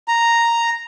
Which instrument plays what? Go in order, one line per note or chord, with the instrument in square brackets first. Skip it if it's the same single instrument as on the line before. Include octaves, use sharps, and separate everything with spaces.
[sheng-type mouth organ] A#5